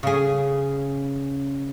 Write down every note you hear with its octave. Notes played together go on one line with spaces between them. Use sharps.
C#3 G#4